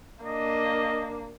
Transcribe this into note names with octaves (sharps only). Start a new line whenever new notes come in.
A#3 D4 D#5